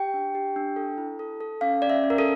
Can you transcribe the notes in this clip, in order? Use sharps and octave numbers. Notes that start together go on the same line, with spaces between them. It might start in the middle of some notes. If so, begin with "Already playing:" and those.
Already playing: G4 G5
D4
G4
D4
A4
E4
A4
A4
C#4 F5
C#4 D5
E5
C#4
A#4
A4